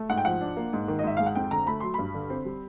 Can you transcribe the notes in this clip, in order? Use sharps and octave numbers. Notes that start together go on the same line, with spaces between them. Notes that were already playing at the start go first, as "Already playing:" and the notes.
Already playing: A3
G#2 F#5
G5
F3 F#5
D4
A#3
G#2
D#3
D#5
G#2 E5
G#3 F5
F#5
F2 G5
D3 A#5
A3 B5
F#3 C6
G2 B5
D3
C4
G3